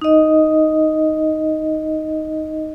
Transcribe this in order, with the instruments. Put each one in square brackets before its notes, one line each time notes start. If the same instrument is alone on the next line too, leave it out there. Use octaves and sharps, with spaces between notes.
[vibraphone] D#4 D#5